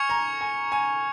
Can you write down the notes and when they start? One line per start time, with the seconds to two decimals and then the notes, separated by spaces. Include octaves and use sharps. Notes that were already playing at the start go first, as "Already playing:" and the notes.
Already playing: G#5 C#6 F6 G#6 C#7 F7
0.09 A#5
0.41 G#5
0.72 G#5